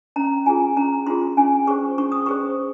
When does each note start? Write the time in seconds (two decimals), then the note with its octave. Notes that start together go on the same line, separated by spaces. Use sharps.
0.16 C#4 A#5
0.46 F4 G#4 G#5
0.76 C#4 A#5
1.07 F4 G#4 C6
1.37 C#4 G#5
1.67 G#4 C5 C#6
1.98 C#4 C#6
2.12 D#6
2.26 G#4 C5 C#6